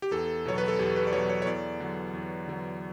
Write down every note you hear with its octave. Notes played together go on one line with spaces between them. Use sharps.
G4
E2 A4
B2 F#3 C#5
B4
A4
E2 G4
B4
D5
B2 F#3 C#5
C#5
C#5
E2 D5
D3 F#3
E2
D3 F#3